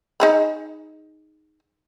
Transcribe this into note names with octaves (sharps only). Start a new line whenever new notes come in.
D#4 G#4 B5